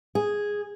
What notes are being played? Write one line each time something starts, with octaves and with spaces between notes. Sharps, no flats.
G#4